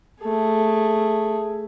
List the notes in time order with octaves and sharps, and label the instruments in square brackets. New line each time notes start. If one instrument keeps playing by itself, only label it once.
[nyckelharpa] A3 G#4